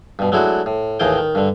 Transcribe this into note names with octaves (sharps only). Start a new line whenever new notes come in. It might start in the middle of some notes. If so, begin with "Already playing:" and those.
G2 B2
F#3 G#3 A3 D4 E4 F#4
A2
D#2 A2 E3 G#4 D#5 G5
D#3
G2 D3